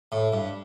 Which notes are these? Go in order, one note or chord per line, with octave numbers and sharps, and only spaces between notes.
A2
G2